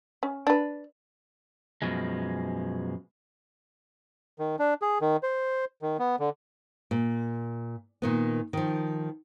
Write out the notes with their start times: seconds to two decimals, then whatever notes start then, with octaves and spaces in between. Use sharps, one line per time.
0.23 C#4
0.47 D4 B4
1.82 F#2 B2 F3 G#3
4.39 D#3
4.59 D4
4.82 G#4
5.01 D#3
5.23 C5
5.82 D#3
5.99 B3
6.19 D3
6.91 A#2
8.02 A#2 D#3 B3
8.53 D#3 F3